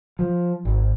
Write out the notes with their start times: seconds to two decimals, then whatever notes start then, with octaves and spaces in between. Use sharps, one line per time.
0.19 F3
0.65 G#1